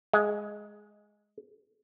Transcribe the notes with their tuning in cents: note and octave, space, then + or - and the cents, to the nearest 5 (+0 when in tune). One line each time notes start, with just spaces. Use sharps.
G#3 +5